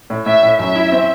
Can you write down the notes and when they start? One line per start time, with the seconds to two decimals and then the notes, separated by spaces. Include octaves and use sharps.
0.10 A2
0.26 A2 E5
0.43 A2
0.59 F#2 E5
0.75 E4
0.92 C4